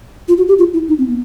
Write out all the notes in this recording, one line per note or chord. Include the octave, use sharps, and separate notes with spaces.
F4
F#4
G4
F4
E4
D#4
C4
B3